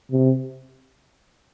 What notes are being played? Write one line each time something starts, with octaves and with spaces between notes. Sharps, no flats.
C3